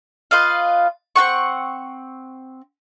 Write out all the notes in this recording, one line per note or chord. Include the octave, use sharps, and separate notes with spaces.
F4 B4 D#5 F5
C4 D#4 F#5 C#6